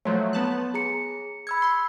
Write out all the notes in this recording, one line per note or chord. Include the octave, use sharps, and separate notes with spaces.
F3 F#3 A3 C#5 C6
B3 A5 F#6
G#4 A#5 C#7
B5 E6 G#6 C#7
C6